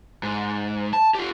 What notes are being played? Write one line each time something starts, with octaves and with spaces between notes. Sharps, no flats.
G#2
A5
F4 G4